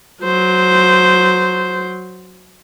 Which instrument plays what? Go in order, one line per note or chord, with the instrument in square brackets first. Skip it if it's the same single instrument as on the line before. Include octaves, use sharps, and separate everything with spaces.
[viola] F#3 C5